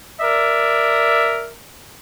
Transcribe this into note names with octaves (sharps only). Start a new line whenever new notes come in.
A#4 D5 E5